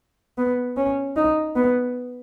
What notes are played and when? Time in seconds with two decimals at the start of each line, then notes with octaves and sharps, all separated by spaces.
0.38 B3
0.77 C#4
1.16 D#4
1.56 B3